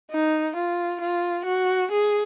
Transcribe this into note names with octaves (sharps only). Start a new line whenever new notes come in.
D#4
F4
F4
F#4
G#4